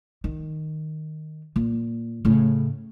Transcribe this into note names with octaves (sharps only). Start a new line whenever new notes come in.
D#3
A#2
A2 C#3